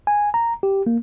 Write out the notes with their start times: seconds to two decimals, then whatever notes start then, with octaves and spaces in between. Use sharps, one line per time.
0.07 G#5
0.34 A#5
0.63 G4
0.86 A#3